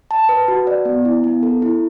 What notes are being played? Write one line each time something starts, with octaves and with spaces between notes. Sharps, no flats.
A5
B4
F#4
D5
B3
E4
B3
A4
E4